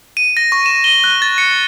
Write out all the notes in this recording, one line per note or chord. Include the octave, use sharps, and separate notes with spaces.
D#7
A#6
C#6
E7
G7
F#6
A6
C#7